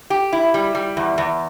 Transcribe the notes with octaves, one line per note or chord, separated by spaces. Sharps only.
G4
E4
G3
G3
E2
E2